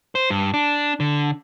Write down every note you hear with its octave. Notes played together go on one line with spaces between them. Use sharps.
C5
G2
D4
D3